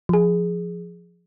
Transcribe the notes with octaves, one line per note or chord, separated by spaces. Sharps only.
F3 G#4